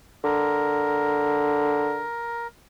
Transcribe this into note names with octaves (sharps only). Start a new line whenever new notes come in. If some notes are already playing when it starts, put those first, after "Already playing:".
D3 A#4